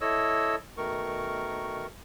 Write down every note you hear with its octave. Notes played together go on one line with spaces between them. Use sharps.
E4 A4 C#5 D#5 E6
B2 D#3 A3 A#4 C#6